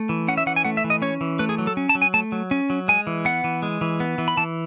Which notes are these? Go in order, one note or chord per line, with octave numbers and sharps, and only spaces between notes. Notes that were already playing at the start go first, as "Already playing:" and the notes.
Already playing: A3
E3
C#4 F#5
E5
E3 F#5
G#5
A3 F#5
E5
E3
D#5
C#4 C#5
E3
A3 B4
G#4
F#3
A4
C#4
A5
F#3
G#5
A3 A5
F#3
C#4
F#3
G#3 G#5
E3
B3 F#5
E3
G#3
E3
B3
E3
B5
E3 A5